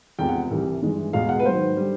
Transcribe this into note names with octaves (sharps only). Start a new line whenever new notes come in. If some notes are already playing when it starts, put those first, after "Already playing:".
E2 C3 F3 G#3 G5
F#5
C2 C3 E3 G3
G2 E3 G#3
E2 B2 G#3 F5
F#5
B4
G#2 D#3 F#3 C5
D3 G3